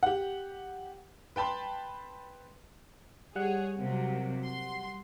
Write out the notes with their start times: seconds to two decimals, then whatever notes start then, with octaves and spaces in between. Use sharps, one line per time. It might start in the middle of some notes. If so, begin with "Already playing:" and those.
0.03 G4 F#5
1.36 B4 G5 A5 B5 C6
3.36 G3 G#4 C#5 F#5
3.76 C3 F#3 A#3
4.45 C6